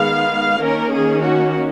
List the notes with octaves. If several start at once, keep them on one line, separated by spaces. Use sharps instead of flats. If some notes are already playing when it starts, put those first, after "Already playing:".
Already playing: D#3 G#3 B3 F5
D#3 A#3 C#4 A#4
G#4
F#4